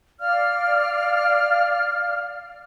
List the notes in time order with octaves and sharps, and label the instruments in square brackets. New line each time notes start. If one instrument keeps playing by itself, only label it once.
[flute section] D5 F5 F6